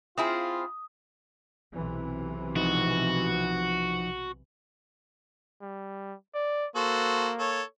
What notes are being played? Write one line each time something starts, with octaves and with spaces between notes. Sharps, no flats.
C4 E4 F4 G#4 D#6
B1 C3 E3
F3 D#4 F#4
G3
D5
A#3 F#4 A4 C5
A4 C#5